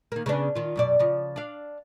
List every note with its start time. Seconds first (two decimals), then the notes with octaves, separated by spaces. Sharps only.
0.12 D#3 A#3
0.26 C#3 B3 D4
0.55 D#3 F4
0.76 F#2 B2 D5
0.99 C#3 F3
1.36 D4 F5